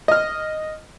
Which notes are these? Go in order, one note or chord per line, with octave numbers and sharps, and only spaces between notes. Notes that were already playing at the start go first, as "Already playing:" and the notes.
D#5 F6